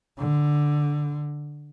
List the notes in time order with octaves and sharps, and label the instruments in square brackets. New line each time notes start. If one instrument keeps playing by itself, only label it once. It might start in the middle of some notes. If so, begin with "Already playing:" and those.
[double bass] D3